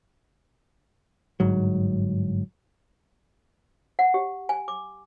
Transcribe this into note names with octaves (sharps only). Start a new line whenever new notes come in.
G1 G#2 F#3
F#5
G4
G#5
D6